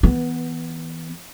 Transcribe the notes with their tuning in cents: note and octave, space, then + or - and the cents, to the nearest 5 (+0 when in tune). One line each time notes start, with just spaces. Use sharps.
E3 -20 B3 +0